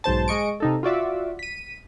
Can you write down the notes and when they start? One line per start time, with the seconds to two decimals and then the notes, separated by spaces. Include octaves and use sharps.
0.04 B1 G#2 C5 A5
0.28 G#3 D#5 C#6 D7
0.60 C3 D#4 A4
0.83 F4 F#4 D5 E5
1.39 B6 D#7